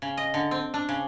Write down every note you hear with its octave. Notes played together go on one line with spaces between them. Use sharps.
C#3
D#5
D3
C4
D4
C#3